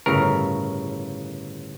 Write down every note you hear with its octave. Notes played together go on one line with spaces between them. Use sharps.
G1 A2 C#3 A#4